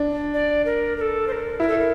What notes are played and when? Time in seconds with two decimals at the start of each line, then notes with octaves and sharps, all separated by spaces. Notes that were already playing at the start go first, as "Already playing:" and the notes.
Already playing: D4
0.34 D5
0.66 A#4
0.97 A#4
1.01 A4
1.27 C5
1.32 A#4
1.60 E4 A#4
1.68 A4
1.79 A#4